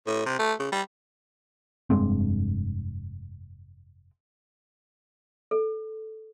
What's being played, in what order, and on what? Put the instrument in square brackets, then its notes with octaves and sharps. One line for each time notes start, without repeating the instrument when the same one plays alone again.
[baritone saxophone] A2
C3
A3
C#3
G3
[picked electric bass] F1 G2 G#3 C4
[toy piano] A4